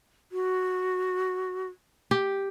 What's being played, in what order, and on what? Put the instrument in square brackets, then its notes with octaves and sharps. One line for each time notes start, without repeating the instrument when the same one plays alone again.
[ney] F#4
[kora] G4